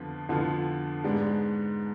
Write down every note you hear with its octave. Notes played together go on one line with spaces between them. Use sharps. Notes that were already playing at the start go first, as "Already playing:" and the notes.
Already playing: F2 D3 F3 B3 F4
F2 D3 F3 B3 F4
G#2 G#3 B3 D4